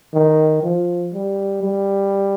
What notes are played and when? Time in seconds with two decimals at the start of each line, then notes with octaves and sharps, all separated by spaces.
0.14 D#3
0.63 F3
1.14 G3
1.63 G3